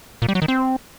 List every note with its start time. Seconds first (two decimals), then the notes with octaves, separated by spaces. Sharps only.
0.22 A#2
0.29 G3
0.35 F#3
0.42 D#3
0.48 C4